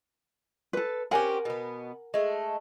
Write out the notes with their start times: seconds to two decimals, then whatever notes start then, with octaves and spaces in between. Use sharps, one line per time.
0.73 A4 B4
1.11 C4 C#4 G4 A#4 F#5 G#5
1.45 B2 B3
2.14 G#3 A3